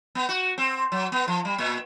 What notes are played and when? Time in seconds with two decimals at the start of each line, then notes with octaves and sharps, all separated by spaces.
0.15 B3
0.29 F#4
0.58 C4
0.92 F#3
1.12 B3
1.28 F3
1.45 G3
1.58 A#2